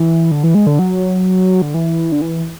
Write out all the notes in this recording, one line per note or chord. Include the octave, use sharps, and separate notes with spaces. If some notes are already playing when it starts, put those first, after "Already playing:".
Already playing: E3
D3
E3
G#3
D3
F#3
D3
E3
D3
E3